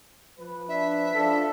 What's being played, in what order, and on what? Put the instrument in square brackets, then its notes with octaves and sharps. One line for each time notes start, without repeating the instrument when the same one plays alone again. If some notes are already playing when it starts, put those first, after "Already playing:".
[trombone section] F3 B4
[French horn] D4 [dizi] E5
[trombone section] F3 F4 [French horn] D4 [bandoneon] A4